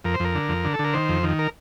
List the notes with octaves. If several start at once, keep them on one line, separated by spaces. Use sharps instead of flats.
F2 A#4
C5
F2 A#4
D3
F2
D3
A4
D3
A#4
D#3 C5
F2
D#3
A#4